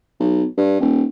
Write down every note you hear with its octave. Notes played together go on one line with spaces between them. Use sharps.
B1
G2
D#1